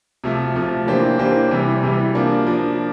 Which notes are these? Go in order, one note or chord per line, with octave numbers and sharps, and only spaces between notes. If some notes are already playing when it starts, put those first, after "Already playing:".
C3 F3 A3
C3 F3 A3
E3 A#3 D4 G4 C5
E3 A#3 D4 G4 C5
C3 E3 G3
C3 E3 G3
F3 A#3 D4
F3 A#3 D4